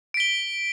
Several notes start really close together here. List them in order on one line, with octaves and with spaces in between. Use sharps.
D7 B6 G7